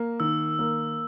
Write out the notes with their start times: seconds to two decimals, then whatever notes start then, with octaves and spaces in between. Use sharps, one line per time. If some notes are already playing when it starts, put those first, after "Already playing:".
Already playing: A#3
0.20 D#3 E6
0.59 A#3